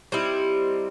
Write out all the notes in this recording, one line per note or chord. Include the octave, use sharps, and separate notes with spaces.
G3 C4 D#4 E4